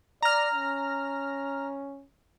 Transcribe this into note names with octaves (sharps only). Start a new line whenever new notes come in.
D5 A#5 F6
C#4